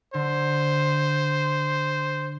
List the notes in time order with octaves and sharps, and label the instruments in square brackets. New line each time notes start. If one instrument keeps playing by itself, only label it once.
[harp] D3 [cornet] C5